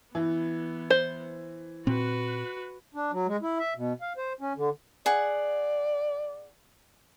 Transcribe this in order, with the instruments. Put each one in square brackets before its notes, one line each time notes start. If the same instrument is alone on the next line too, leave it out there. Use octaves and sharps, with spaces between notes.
[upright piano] E3 [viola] B3
[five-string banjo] C5
[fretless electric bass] A#2 C4 [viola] F#4 B4
[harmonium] D4
F#3
G#3
E4
E5
B2
F5
C5
C#4
D3
[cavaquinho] G#4 F#5 [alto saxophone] D5